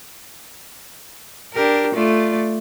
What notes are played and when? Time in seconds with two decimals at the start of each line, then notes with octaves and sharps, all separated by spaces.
1.54 D4 G4 A#4
1.95 A3 F4 D5